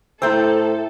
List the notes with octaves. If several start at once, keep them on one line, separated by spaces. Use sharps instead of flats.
A2 A3 E4 A4 C5 G5 A#5 E6